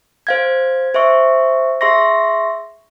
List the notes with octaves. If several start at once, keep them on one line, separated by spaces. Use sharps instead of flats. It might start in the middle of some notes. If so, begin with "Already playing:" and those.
C5 F5 G#6
C5 E5 C#6
G#4 E5 C6 C#6 A#6